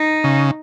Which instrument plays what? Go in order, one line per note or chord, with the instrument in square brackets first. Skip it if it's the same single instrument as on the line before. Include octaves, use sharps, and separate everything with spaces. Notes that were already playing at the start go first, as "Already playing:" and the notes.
Already playing: [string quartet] D#4
[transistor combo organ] C#3